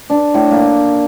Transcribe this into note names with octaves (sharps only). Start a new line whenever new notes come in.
D4
A2
A#3